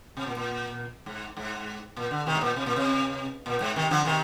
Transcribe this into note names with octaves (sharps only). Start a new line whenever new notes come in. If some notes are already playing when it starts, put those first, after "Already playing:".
C3
A#2
A#2
G#2
G#2
A#2
D3
C3 D#3
G#2
A#2
C3
A#2
C3
A#2
G#2
C3 D#3
D3 F3
C3 D#3